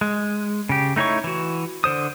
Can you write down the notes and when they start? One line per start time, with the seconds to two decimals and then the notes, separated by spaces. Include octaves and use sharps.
0.01 G#3
0.69 C#3 G4
0.96 A3 D#4 E4 C#5 C#6
1.24 E3 F#4
1.84 D3 C5 D#6